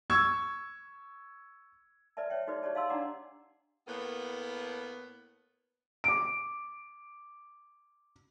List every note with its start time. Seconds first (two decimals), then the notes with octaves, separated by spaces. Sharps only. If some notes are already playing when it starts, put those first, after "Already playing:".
0.10 C#6 E6 G#6
2.17 B4 D5 E5 A5
2.30 C#5 E5 G5
2.47 D#4 F#4 G#4 B4 C5 D5
2.63 G4 C#5 D5 A5
2.75 D#5 F5 A5 C6 E6
2.89 D4 D#4 D5 F#5 A#5 D6
3.88 A2 A#3 B3
6.04 D6 D7